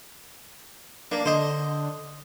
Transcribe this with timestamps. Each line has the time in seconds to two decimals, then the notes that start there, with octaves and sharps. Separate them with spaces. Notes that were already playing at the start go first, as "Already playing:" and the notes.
1.12 A#3 D4
1.26 D3 C5 D#5